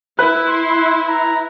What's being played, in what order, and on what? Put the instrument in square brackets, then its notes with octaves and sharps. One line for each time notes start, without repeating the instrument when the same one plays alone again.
[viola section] E4 [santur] B4
[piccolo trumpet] C6
A#5